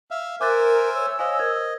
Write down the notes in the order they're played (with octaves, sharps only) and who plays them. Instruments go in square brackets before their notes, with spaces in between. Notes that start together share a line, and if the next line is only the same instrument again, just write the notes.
[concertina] E5 F5
[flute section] A#4 [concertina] C5 E5 G#5 [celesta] D6 F#6 A6
[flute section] C#5 E6
[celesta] C5 F5 G#5 [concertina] D#5
[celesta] A#4 C5 G#6